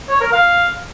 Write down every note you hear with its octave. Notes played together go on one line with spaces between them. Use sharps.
C#5
A#4
F5